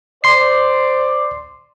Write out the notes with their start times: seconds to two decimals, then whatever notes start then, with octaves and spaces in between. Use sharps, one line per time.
0.24 C5 D5 C6 C7